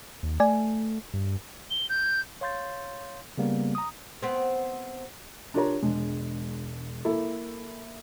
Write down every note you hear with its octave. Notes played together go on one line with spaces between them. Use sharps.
D#2
A3 D5 G#5
G2
G7
G6
C#5 F5 C6 G6 A6
C#3 G3 A#3 B3
A#5 D#6
B3 C4
D4 F4 G4 A#4 C#5 A#5
E1 G#3 D4
A#3 E4 A4